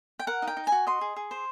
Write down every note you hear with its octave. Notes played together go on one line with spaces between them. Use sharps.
G5
A#4 F#5
D#4
G5
D#4
G#5
F#4
D#5 C6
G#4
G#4
C5